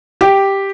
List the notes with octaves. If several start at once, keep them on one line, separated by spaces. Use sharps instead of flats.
G4